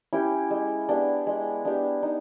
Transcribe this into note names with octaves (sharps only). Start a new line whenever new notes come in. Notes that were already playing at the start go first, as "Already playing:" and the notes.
C#4 E4 G4
G#3
B3 D4 G4
G#3
B3 D4 G4
D#4